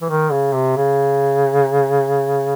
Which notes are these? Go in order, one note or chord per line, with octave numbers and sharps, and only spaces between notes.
E3
D#3
C#3
C3
C#3